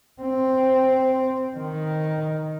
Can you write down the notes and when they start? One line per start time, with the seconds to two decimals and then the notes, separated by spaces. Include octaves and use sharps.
0.22 C4
1.57 D#3